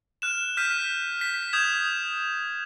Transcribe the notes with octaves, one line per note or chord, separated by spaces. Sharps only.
F6 F#6 E7
F6 G6 B6 D#7
B6
D#6 G6 G#6 E7